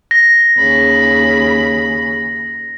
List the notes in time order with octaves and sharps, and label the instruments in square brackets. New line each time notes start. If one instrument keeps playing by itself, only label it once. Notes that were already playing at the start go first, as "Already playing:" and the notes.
[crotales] A#6
[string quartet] D#2 C#3 B5